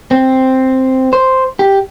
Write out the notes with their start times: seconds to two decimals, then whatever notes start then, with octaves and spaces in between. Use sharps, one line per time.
0.11 C4
1.13 C5
1.59 G4